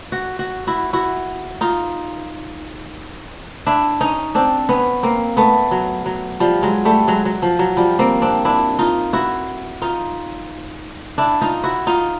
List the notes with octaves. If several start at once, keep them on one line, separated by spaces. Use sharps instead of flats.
F#4
F#4
E4 F#4
E4 F#4
D#4 F4
D4 E4
C#4 D#4
C4 D4
B3 C#4
A#3 C4
A3 B3
F#3
F#3
F3 G3
F#3 G#3
G3 A3
F#3 G#3
F#3
F3
F#3
F3 G3
A#3 C4
C4 D4
D4 E4
D#4 F4
E4 F#4
D#4 F4
D4 E4
D#4 F4
E4 F#4
D#4 F4